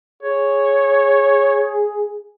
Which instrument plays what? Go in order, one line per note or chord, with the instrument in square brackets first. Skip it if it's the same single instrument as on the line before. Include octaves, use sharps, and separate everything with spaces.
[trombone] G#4 [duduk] C#5